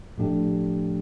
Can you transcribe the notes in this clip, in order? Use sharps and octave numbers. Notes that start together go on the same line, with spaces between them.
A2 F3 A3 D4 G4